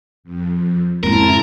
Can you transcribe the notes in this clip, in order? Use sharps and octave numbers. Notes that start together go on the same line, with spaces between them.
F2
F2 G#2 C#3 C4 E4 A#4 A5